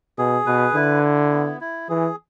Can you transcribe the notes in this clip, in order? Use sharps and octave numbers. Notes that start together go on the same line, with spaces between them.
B2 G#4
B2 B4
D3 E4
E4
B3
E4
E3 G#4